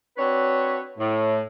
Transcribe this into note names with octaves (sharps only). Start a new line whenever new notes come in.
C4 D4 F#4 B4 C#5
A2